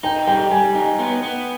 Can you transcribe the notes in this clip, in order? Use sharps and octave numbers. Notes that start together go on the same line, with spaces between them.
D#4 G5
G3 G5
G3 G#5
D#4
B3
B3